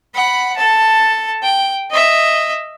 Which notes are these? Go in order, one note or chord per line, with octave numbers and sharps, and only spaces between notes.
F#5 B5
A4 A5
G5
D#5 E5